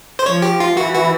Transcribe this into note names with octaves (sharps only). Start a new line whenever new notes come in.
C5
F3 C#5
G4
F4
E3 F#4
F#4